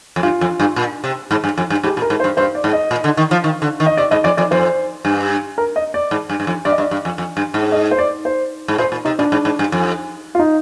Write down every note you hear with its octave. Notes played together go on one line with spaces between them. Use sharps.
F2
G2 F4
F2
G2
A#2
C3
G#2
G2
F2
G2
G#2 G4
A#2
A#4
G#2
C5
G2
G2 C5
D5
G#2
D#5
A#2
D3
D#3
F3
D#3
D3
D#3
D#5
C3 D5
G#2 D#5
F2 D5
F2 D5
F2 C5
G2
A#4
D#5
D5
G#2
G2
G2
F2
G2 D5
D#5
G2 D5
G2
F2
F2
G2
G#2
D#5
C5
D5
C5
G#2
A#2 C5
A#2
C3 D#4
A#2 D4
G#2
G#2
G2
F2
F4
D#4